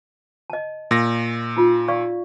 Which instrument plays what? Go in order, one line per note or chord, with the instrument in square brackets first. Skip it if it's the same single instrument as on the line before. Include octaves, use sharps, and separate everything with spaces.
[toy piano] D#5 A5
[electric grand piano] A#2 A#6
[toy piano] D#4 F4
D5 F5 C#6